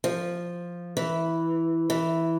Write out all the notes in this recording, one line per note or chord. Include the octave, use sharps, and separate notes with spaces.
F3
E3
E3